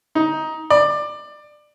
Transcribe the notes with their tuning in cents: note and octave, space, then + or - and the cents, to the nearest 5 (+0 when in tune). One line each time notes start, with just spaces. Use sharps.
D#4 +15
D5 +20